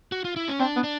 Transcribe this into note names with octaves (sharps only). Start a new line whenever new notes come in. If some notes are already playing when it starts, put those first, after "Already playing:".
F#4
F4
E4
C#4
C4 D4
B3
D4